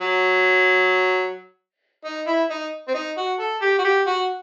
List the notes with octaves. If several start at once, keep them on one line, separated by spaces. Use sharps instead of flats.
F#3
D#4
E4
D#4
C4
D#4
F#4
A4
G4
F#4
G4
F#4